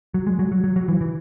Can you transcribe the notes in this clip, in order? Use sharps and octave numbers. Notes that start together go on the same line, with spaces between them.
F#3
G#3
F#3
F#3
F#3
F#3
E3
E3